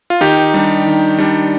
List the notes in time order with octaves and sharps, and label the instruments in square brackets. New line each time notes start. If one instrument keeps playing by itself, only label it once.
[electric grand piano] F4
D#3 D#4 G4
G3 D4
D#3
G3 D4